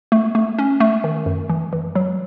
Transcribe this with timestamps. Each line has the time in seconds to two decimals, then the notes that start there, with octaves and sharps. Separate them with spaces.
0.12 A3
0.35 A3
0.59 C#4
0.80 A3
1.04 D#3
1.26 F#2
1.50 E3
1.73 E3
1.95 F#3